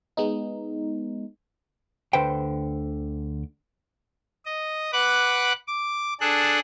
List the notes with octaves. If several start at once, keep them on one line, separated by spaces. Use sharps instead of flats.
G#3 B3 D#4
D2 D3 B4 C5 G5
D#5
B4 F#5 D6 F#6
D6
D4 G#4 A4 F#6